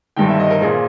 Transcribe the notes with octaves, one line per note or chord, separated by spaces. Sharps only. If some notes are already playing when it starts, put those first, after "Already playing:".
G1 G2 D#3 G5
E5
D#5
A#4
A#1 A#2 G#4